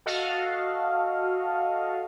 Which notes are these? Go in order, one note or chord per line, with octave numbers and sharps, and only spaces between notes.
F#4 A4 D#5 F5